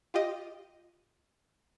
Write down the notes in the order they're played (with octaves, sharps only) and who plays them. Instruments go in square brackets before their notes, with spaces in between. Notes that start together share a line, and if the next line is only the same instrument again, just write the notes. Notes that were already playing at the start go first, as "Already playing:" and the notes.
[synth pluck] F4 G4 D#5